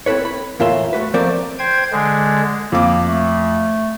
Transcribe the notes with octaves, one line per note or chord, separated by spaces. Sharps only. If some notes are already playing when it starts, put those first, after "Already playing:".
C4 E4 A4 B4 C#5
B5
E2 A2 F4 A#4 E5 C6
A3 F#4 B4
F3 A3 C4 A#4 D5
C5 G5 G#6
D3 G#3
F2 A#3 D6
A3